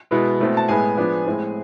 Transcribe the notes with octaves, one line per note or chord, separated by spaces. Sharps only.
B2 G#3 B3 E4
B2 A3 C4 E4
A5
A2 G#3 B3 E4 G#4 G#5
F3 B3 D4
A2 G#3 C4 E4